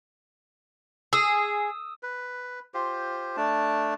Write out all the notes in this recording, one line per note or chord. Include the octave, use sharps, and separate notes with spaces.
G#4 D#6 E6
B4
F4 G4 C5
A3 D4 A5